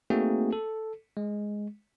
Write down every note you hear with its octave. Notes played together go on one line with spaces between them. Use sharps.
A3 A#3 C4 D#4 F#4 G#4
A4
G#3